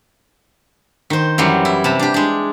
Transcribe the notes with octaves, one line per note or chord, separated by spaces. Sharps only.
D#3 C5
F#2 E3 F#3 G3
E4
C3 A5 B5
D4 G4
G#3 D4